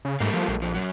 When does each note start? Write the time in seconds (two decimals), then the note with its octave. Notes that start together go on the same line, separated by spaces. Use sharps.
0.05 C#3
0.20 G#2 G3 A3 A#3
0.34 F3
0.48 A#1
0.62 F2 F3
0.74 F#2 F#3